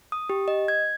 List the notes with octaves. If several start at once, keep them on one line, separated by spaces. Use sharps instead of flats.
D#6
G4
D#5
G#6